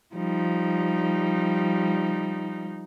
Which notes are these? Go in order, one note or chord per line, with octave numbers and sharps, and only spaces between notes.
F3 G3 D#4